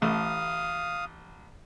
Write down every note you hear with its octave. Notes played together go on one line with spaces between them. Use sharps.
A1 A3 F5 D#6